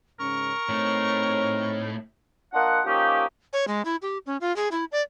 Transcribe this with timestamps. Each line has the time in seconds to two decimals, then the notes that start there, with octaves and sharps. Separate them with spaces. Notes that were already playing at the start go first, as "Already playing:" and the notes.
0.19 G#2 C#3 C#4 A#4 C#6
0.69 A2 A3 C4 D#4 C#5
2.53 A#3 D4 F4 D#5 F#5
2.85 F3 A#3 C#4 D#4 G4
3.53 C#5
3.68 G#3
3.85 E4
4.02 G4
4.26 C#4
4.41 F4
4.56 G#4
4.72 E4
4.92 D5